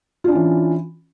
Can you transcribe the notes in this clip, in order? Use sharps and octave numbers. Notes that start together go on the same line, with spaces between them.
E3 C#4 D4 F4